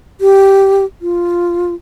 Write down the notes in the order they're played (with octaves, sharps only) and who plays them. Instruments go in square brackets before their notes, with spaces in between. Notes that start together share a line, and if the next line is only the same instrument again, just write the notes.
[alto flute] G4
F4